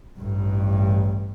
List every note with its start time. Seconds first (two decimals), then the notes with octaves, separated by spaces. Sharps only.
0.18 A1 G2